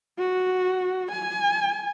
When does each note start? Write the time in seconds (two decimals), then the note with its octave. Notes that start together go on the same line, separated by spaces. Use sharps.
0.19 F#4
1.12 G#5